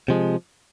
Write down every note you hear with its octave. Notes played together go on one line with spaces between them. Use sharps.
C3 F3 G#3